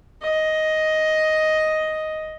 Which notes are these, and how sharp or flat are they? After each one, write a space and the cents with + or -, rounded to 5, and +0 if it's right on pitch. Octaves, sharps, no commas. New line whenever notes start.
D#5 +5